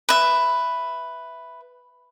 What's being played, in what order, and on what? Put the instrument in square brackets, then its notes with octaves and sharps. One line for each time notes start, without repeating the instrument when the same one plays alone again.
[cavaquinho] B4 E5